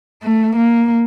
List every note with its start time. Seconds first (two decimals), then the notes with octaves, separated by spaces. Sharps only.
0.23 A3
0.56 A#3